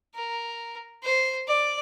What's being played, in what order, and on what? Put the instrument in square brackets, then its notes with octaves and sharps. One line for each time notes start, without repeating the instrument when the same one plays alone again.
[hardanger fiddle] A#4
C5
D5